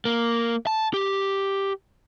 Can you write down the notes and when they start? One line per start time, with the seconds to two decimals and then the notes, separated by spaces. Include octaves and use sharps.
0.05 A#3
0.67 A5
0.94 G4